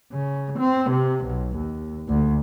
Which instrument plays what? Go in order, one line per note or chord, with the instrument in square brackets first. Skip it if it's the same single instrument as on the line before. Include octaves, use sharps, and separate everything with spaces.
[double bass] C#3
C4
C3
B1
D#2
D2